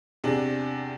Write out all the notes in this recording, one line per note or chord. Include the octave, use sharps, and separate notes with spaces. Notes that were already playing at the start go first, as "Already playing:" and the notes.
E2 C3 D4